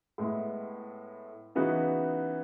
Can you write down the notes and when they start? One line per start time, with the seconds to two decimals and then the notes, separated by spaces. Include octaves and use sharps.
0.18 A2 G#3 B3 E4
1.55 C#3 E3 B3 D#4 F#4